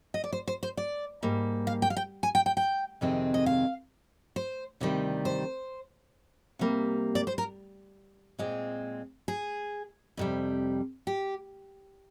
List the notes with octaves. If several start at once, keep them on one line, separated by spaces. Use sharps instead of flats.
D#5
D5
C5
C5
C5
D5
G#2 G3 A#3
F5
G5
F5
G5
G#5
G5
G5
G5
F2 C3 D#3 G#3 C4
D#5
F5
C5
D2 C3 D#3 G3
C5
C3 G3 A#3
D5
C5
A#4
A#2 G#3 C4
G#4
F2 C3 G3
G4